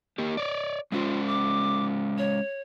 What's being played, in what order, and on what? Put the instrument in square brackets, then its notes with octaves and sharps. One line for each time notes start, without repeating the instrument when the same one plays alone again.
[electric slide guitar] A#3 G4
C#5 D5
[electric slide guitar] G#3 C#4 C5 [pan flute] F4
[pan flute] D6
C#5